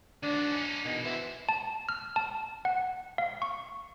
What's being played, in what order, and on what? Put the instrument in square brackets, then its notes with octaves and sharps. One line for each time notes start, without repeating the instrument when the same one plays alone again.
[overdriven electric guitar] D#3 F#4 [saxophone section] D4
[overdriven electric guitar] C#4 D#4
[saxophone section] E2 D#3 G#3 [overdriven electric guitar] B2
[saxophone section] B2 E3 [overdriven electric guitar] C5 E5
[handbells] A5
F6
A5
F#5
F5
C#6